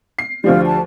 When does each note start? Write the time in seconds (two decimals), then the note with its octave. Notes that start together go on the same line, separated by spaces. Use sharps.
0.19 C7
0.44 D2 F3 G3 F4
0.66 A5